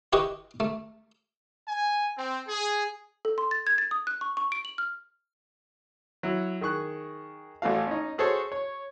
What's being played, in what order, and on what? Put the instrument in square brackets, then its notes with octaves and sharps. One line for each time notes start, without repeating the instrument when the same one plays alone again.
[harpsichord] E4 G4 B4 D#5 C#6
A3
[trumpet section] G#5
C4
G#4
[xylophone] A4
C6
A6
G#6
A6
D#6
F#6
C#6
C#6
D7
F#7
F6
[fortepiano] F#3 E4
D#3 G#4 C#6 F#6
A1 A3 F#4 F5
C#4 D#4
F#4 G#4 A4 C5 C#5
C#5